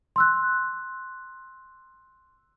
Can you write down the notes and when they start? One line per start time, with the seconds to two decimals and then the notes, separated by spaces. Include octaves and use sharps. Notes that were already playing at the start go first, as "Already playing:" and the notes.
0.16 C6 E6 F#6